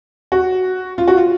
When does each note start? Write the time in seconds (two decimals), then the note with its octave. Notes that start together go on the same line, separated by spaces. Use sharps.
0.32 F#4
0.98 F4
1.08 F#4
1.17 F4